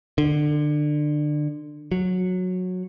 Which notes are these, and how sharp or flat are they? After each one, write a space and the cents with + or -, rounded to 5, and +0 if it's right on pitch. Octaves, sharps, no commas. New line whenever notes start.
D3 +25
F#3 -15